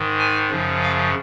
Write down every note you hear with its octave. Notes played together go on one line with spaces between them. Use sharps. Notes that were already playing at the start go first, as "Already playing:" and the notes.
Already playing: G#2 D#3
G#5
F#2 C#3 F3
F5